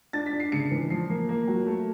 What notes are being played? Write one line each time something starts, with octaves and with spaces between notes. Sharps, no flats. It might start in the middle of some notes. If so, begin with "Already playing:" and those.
D4 A6
B6
D4
C7
C#3 C#7
E3
F3 C7
A#3
A#3
F#3
A3